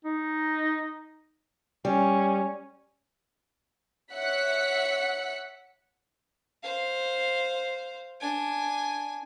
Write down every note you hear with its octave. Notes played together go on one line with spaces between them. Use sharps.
D#4
G3 C#4
C#5 E5 F#5 F#6 B6 C#7
C5 F5
D4 G#5